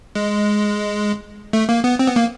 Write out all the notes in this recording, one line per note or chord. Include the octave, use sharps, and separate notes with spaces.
G#3
A3
A#3
B3
C4
B3
A#3